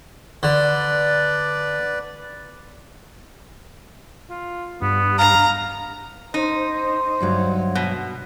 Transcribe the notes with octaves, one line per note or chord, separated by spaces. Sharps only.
D3 B4 D5
F4
G2 B3
F5 A#5
D#4 C5
D2 G2 F#3
B2